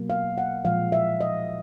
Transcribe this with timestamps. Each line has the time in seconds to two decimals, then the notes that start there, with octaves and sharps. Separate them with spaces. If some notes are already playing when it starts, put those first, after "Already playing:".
Already playing: B2 F#3 A#3
0.10 F5
0.38 F#5
0.65 A#2 F3 G#3 F5
0.92 E5
1.21 D#5